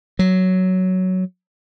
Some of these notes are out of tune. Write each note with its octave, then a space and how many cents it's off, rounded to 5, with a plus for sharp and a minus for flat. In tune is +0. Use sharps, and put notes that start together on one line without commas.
F#3 +5